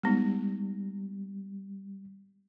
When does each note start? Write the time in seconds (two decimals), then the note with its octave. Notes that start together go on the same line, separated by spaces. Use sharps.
0.03 G3 G#3 B3 D#4